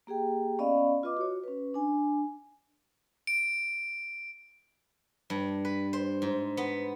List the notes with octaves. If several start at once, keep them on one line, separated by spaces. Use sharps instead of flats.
A#3 G4 G#4 G5
B3 C#4 D5 D#5 F5 B5
F4 B4 D#5 D6
F#4 C#5
C#4 B4
D4 G#5
D7
G2
B4
C5
G#2
B3